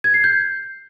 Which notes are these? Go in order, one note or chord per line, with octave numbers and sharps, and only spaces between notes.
G#6
C7
G6